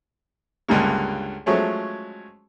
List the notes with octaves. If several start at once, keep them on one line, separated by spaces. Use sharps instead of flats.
C#2 G2 D3 G3 A#3
F3 F#3 G#3 A3 C#4